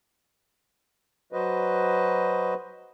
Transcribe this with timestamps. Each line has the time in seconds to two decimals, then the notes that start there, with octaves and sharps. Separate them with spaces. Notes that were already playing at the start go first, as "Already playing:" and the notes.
1.33 F#3 F#4 B4 C5 D#5